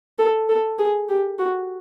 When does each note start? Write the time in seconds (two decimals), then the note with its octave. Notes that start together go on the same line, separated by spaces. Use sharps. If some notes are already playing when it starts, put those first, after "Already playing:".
0.18 A4
0.49 A4
0.78 G#4
1.09 G4
1.39 F#4